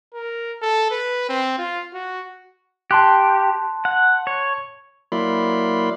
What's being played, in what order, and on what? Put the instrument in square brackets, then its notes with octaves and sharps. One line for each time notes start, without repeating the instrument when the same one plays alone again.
[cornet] A#4
A4
B4
C4
F4
F#4
[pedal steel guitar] G4 [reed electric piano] A5 C6 F#6
[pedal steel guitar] F#5
C#5
[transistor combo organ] F#3 A#3 E4 D5 B5 C6